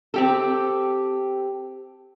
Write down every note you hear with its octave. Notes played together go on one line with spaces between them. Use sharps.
C4 G4 A4